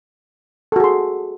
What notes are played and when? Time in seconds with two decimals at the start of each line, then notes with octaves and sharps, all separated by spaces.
0.72 A4
0.76 F#4
0.80 G#4
0.84 C6